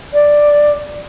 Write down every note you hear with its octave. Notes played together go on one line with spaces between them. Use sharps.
D5